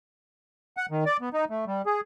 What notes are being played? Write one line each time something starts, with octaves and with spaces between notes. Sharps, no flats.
F#5
D#3
D5
B3
D#4
A3
G3
G#4